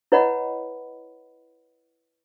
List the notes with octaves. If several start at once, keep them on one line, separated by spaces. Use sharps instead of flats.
E4 B4 C#5 D#5 F#5 B5